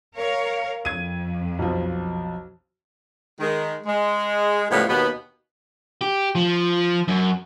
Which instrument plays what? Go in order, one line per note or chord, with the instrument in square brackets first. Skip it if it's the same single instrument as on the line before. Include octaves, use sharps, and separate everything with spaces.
[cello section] A#4 C#5 F5
[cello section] F2 [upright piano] G#6 D#7
[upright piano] B1 F3
[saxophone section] D#3 G#3
G#3
A2 C#3 F3 G3 G#3 B3
D#2 B2 B3
[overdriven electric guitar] G4
F3
F#2